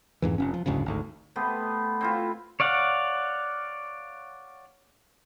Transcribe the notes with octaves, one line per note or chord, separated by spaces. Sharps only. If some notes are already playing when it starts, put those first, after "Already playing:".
F2 G#2 E3
F1 C#4
F3
F#1 D2 G#2 C#3
G#1 D2
C3 A3 B3
C4 E4 F4
C#5 D5 F5 F#5